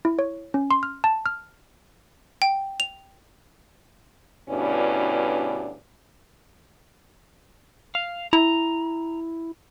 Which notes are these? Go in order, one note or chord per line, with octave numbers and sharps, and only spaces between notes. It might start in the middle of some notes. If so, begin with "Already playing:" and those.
E4
C#5
C#4
C6
F6
A5
F6
G5
F7
D2 G2 B2 C#4 E4 D5
F5
E4 A#5